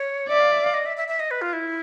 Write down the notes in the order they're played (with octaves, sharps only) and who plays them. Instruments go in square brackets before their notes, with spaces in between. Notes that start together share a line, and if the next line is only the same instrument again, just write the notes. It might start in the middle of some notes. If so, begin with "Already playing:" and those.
Already playing: [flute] C#5
[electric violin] D5 [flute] E5
[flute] F5
E5
F5
D#5
E5
E5
E5
D#5
B4
F4
E4